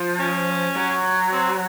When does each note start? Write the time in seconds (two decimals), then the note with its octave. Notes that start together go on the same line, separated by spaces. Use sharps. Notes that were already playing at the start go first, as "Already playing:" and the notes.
Already playing: F3
0.19 C#4
0.76 F#3
1.32 C4